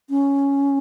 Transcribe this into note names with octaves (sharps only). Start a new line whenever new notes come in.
C#4